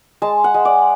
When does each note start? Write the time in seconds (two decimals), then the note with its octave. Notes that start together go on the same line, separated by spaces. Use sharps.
0.22 G#3 A5
0.44 F#5
0.54 G#3
0.65 D5